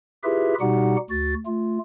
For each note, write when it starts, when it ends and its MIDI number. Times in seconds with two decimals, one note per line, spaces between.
0.24 0.55 64
0.24 0.55 65
0.24 0.55 67
0.24 0.55 68
0.24 0.55 71
0.24 0.55 76
0.61 0.96 47
0.61 0.96 55
0.61 0.96 63
0.61 0.96 66
0.61 0.96 67
0.61 0.96 78
1.10 1.34 38
1.10 1.34 66
1.10 1.34 93
1.46 1.79 57
1.46 1.79 65